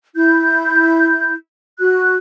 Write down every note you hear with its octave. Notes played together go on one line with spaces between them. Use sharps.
E4 G6
F#4 F#6